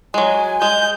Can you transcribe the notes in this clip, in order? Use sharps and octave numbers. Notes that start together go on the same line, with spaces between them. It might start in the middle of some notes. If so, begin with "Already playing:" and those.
F#3 G#3 G#5
G#3 G6